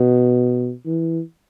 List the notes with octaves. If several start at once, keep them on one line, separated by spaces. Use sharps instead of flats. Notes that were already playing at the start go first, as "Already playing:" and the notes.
Already playing: B2
E3